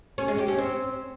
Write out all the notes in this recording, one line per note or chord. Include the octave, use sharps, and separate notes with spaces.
C#4
G#3
G4
C#4
C4